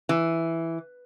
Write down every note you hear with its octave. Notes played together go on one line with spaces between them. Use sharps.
E3